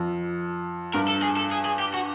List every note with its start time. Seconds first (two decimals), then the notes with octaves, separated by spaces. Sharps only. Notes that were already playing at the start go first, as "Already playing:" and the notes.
Already playing: F2
0.94 G2 A#4
1.08 A4
1.22 G#4
1.37 A4
1.52 G#4
1.65 G#4
1.79 G4
1.94 F#4